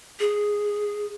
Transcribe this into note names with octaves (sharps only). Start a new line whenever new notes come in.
G#4